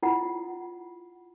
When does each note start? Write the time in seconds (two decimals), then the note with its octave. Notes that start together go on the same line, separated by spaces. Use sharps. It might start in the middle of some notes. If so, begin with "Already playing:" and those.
0.03 E4 F4 F#5